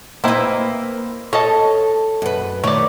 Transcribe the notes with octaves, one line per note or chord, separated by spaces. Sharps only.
A#3 C4 D#4 E4 B4
A4 C#5 D#5 A5
F#2 B4
D#3 A3 C#5 D5